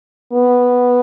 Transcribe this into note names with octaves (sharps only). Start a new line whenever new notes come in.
B3